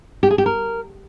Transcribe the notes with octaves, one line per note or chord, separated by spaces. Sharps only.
G4
G#4
G4
A#4